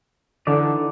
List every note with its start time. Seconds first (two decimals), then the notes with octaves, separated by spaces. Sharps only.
0.47 D3 E3 D#4 D5